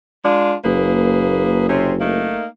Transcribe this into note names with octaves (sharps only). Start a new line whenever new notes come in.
G#3 D4 F4
F#1 A#3 G#4 B4
C3 C4 C#4
A3 A#3 D#4